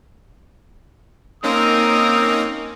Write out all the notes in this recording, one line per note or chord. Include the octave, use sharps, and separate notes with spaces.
A#3 C4 C#4 D#4 A#4 D#6